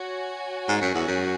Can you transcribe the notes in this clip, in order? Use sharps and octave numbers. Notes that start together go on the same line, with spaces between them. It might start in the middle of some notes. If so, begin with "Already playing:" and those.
Already playing: F#4 C#5 G#5
G#2
F#2
E2
F#2